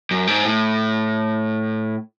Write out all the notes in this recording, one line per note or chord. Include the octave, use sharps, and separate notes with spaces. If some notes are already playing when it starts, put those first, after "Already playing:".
F#2
G#2
A2